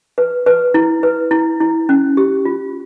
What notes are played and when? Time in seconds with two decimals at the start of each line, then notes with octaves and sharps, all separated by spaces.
0.18 B4
0.46 B4
0.74 E4
1.03 B4
1.31 E4
1.60 E4
1.89 C#4
2.17 G4
2.45 F4